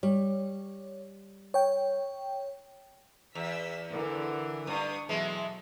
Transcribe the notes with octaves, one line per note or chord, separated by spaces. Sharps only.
G3 C#5
C#5 G5
E2 E6 B6
D3 E3 A#4
G2 D4 C#6 D#6
B2 E3 F#3 G#3 A4